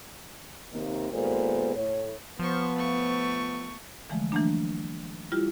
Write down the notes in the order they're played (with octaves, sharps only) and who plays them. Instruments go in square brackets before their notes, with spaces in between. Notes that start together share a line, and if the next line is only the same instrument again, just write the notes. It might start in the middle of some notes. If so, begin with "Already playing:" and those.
[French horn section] D#2 C3 D#3 A#3
D#2 A#2 G#3 B3 A4 C5
A2 C#5
[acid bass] F3 [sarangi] B3 [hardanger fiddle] C5 C#6
[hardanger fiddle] A3 C#6
[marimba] D3 E3 F3 G#3 A3
E3 F#3 A3 A#3 D4
G3 E4 F4 G4